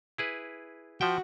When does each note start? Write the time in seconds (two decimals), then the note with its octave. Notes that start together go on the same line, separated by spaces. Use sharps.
0.18 E4 G#4 B4
1.01 F3 F#4 E5 G5